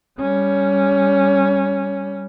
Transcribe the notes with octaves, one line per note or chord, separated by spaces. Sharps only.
G3 C#4